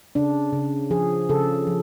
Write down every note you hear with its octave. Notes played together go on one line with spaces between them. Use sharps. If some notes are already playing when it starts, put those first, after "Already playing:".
C#3 D4
C#3
F3 G#4
C#3 A4
F3